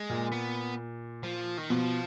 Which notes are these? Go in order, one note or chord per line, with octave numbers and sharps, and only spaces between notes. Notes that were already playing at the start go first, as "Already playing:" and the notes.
Already playing: G#3
A#2
B3
F3
D#3
B2 F3